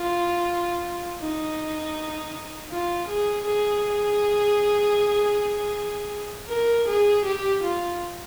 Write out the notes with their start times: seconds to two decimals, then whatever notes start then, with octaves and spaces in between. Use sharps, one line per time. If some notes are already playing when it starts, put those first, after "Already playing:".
Already playing: F4
1.20 D#4
2.71 F4
3.08 G#4
3.46 G#4
6.49 A#4
6.87 G#4
7.25 G4
7.63 F4